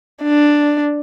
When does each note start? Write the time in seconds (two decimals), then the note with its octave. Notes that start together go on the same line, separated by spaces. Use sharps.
0.23 D4